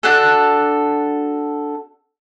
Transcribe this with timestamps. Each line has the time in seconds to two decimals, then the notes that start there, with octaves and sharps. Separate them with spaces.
0.03 D4 F#4 A4